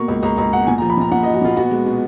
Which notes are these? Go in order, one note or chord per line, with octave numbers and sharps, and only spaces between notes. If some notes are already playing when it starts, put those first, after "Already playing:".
Already playing: B2 A#3 C#6
C#2
C#2 A#5
C#2 A#5
B2 F#5
A#2 G#5
A#5
F3
B5
A#2 A#5
A#2 F#5
D#5
F3
F#4
A#2 F4
B3 F#4
G#3
B2